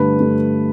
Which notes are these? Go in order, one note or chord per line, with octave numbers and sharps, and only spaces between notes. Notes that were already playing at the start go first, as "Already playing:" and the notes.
Already playing: G2 D3 A3 B4
G2 D3 A3